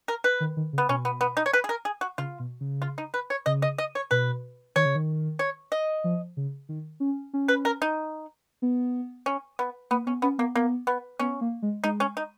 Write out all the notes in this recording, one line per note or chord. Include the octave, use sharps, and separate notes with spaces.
A#4
B4
D#3
D#3
C#3
B3
B2 C#4
B3
B3
D#4
C#5
B4
G#4
A#4
G#4
F#4
C#3 F4
B2
C#3
F4
D#4
B4
C#5
C#3 D#5
D#5
D#5
C#5
B2 B4
D#3 C#5
C#3
D#3
C#5
D#5
F3
C#3
D#3
C#4
C#4
B4
A#4
D#4
B3
C#4
B3
A#3 B3
B3 C#4
B3 C#4
A#3 B3
A#3 B3
B3
B3 C#4
A#3
G#3
G#3 D#4
C#4
D#4